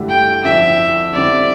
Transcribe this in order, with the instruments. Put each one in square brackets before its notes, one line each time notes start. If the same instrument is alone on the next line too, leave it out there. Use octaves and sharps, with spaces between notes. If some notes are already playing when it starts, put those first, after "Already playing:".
Already playing: [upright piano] G2 D3 A3 E4 G4
[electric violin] G5
[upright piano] F2 D3 F3 C4 E4 [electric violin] E5
[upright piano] D3 G3 C4 E4 [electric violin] D5